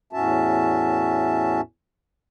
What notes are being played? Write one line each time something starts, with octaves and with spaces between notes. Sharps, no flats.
E2 A2 C#4 F#4 E5 A5